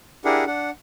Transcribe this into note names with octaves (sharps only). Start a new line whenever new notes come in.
D4 E4 G4 G#4 A#4 F#5
D4 F#5